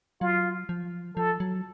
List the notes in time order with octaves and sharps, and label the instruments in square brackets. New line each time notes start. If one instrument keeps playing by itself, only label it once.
[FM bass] F#3 [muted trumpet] F4
[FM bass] F3
[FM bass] F3 [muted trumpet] A4
[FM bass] F#3